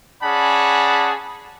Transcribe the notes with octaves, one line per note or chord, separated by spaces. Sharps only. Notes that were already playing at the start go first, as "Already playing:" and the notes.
C#4 G#4 D5 F#5 A5 B5